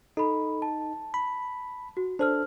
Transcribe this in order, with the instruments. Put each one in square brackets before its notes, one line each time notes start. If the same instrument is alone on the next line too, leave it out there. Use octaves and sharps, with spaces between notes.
[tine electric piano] D#4 [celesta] A4 B5
[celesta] A5
[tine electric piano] B5
[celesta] F#4
[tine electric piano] D4 A4 [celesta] C5 F6